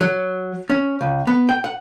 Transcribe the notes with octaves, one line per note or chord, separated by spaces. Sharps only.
F#3
C#4
C#2
B3
G5
F#5